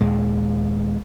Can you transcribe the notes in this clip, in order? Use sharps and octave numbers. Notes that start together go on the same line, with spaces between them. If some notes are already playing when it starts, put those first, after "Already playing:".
D#2 A#2 G#3